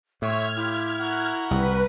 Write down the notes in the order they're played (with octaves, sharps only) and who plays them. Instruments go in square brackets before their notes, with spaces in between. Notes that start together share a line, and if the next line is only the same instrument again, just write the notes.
[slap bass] A2 [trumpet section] C4 C#5 [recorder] E5 [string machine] F6 G#6
[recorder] E4 [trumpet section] F4 G4
[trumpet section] F#4 A#4 F#5
[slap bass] C2 [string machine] B4